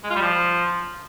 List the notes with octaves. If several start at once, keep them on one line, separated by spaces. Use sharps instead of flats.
G#3
F4
G3
F3